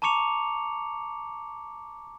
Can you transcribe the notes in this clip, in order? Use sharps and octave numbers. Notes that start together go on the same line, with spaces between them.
A5 A#5 C#6 D6 C#7 F7